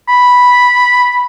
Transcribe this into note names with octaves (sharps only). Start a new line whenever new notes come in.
B5